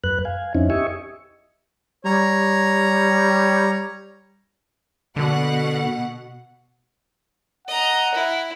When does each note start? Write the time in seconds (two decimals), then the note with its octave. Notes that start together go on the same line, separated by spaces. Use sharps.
0.04 F#2 B4 F#6
0.25 F5 G#5
0.55 F2 C4 C#4 D#4 E4
0.70 G4 D#5 E5 G#5 C#6
2.05 G3 C#5 A#5
5.16 B2 D3 F#5
7.67 D#5 F#5 A#5
8.14 E4